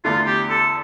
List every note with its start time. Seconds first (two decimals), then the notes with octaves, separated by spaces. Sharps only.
0.04 E2 D3 A3 E4 F4
0.26 G4
0.50 A4